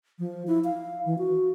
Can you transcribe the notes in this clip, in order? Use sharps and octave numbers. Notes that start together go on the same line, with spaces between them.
F3
E4
F5
E3
F#4